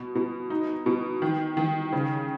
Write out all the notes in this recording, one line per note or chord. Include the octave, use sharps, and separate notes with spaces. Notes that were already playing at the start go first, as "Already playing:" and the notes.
Already playing: B2
B2
D#4
B2
D#3
D#3
C#3